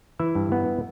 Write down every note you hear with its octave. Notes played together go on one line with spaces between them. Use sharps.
E3 E4 E5
G2
B3